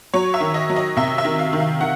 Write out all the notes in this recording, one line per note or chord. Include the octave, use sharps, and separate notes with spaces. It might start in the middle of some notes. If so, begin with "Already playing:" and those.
F#3 C#5
E5
D#3
D#5
F#3
D#5
C3 E5
E5
D#3
F5
D#3
F5
D#3 F#5